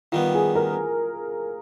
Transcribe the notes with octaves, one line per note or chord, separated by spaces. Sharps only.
D#3 G3 B3 F4
G#4
A#4